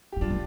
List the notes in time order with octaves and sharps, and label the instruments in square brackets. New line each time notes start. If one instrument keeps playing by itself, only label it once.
[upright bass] F3 [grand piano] G4
[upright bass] G3 [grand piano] D4 F4
[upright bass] D#3